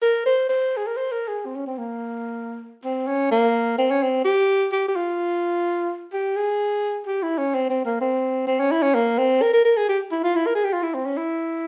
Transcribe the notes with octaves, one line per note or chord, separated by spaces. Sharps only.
A#4
C5
C5
G#4
A#4
C5
A#4
G#4
C4
C#4
C4
A#3
C4
C#4
A#3
C4
C#4
C4
G4
G4
G4
F4
G4
G#4
G4
E4
C#4
C4
C4
A#3
C4
C4
C#4
E4
C#4
A#3
C4
A#4
A#4
A#4
G#4
G4
E4
F4
E4
A#4
G#4
G4
F4
E4
C4
C#4
E4